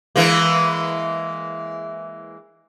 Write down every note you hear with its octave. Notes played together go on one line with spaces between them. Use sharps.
E3 G#3 A#3